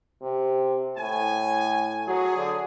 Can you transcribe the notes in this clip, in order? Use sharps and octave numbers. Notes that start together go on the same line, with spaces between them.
C3
A2 G#5
F#3 G#4
D3